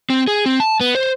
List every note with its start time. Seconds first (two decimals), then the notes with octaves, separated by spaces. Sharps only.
0.10 C4
0.28 G#4
0.46 C4
0.60 A5
0.80 B3
0.95 C5